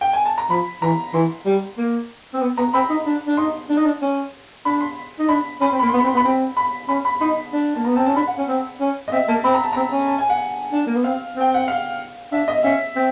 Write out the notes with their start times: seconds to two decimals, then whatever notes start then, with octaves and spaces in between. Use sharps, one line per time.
0.01 G5
0.13 G#5
0.25 A5
0.38 A#5
0.50 F3 B5
0.82 E3 A#5
1.14 E3 C6
1.46 G3
1.78 A#3
2.34 C4
2.42 B3
2.57 B3 A#5
2.74 C4 B5
2.89 D#4
3.06 D4
3.27 D4
3.37 D#4 C6
3.69 D4
3.77 D#4
3.86 D4
4.02 C#4
4.65 D4 B5
4.81 C6
5.19 D#4
5.29 D4 B5
5.61 C#4 B5
5.70 C4 C6
5.79 A#3 B5
5.89 B3 C6
5.99 B5
6.04 C4
6.07 C6
6.14 B3
6.17 B5
6.25 C4
6.57 B5
6.88 C#4 B5
7.05 B5
7.21 D#4 B5
7.53 D4
7.75 A#3 A5
7.85 B3 A#5
7.96 C4 A5
8.06 C#4 A5
8.16 D4 B5
8.27 F#5
8.38 C#4
8.48 C4
8.80 C#4
9.08 D#5
9.12 C4 E5
9.28 A#3 A5
9.44 C4 B5
9.54 A#5
9.63 A5
9.73 C4 A#5
9.92 C#4
10.08 A5
10.19 G#5
10.30 F#5
10.72 D4
10.86 A#3
10.96 B3
11.04 C4 F5
11.36 C4 G5
11.54 F#5
11.68 F5
12.32 D4 E5
12.48 D#5
12.63 C#4 E5
12.96 C4